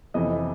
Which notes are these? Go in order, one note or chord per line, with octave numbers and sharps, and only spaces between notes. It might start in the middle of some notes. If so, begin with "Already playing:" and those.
F2 C3 E3 D#5